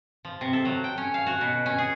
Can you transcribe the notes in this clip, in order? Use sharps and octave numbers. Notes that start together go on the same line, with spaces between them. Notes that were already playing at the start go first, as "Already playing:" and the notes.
F3
C3
A4
F#3
G5
C#4
F5
F#4
B2
C#4
G#4